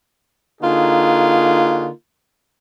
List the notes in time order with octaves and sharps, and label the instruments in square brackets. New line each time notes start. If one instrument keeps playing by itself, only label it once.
[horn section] D3 A#3 D#4 F4 F#4 G#4